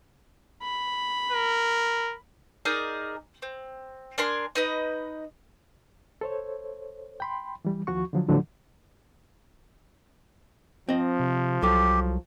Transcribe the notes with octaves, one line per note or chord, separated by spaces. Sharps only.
B5
A#4
D#4 G#4 A#4 D5
C4
D4 A#4 G#5 C6
D#4 B4 D#5
A4 C5 C#5
G5 B5 C6
E3 G3
D#2 F3 F#4 C#6
D3 F3 F#3
A2 D3 F3 F#3
F3 C4 D#5
C3
C2 F#3 G4 A4